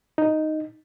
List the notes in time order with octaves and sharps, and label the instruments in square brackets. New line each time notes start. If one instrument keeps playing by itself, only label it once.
[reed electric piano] D#4